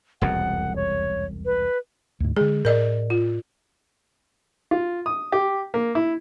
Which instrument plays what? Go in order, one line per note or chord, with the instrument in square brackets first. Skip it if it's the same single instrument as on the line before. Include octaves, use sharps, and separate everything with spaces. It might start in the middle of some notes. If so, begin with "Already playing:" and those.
[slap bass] E1 C2 F2 [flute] F#5
[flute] C#5
B4
[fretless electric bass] D2 G#2
[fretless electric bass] D3 G#3 [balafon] G#4
[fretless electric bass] A2 [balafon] A#4 D5 D#5
[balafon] F4
[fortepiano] F4
D#6
G4
A#3
E4